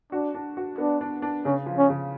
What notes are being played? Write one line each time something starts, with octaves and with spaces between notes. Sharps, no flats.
D4 F#4
D4
F#4
B3 D4
D4
D4
C#3 C#4
F3
C#4
C#3